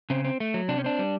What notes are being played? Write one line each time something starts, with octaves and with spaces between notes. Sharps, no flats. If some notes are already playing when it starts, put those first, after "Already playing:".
C#3 C4
C4
A3
F#3
C3 D4
C#4
C4 D4
G3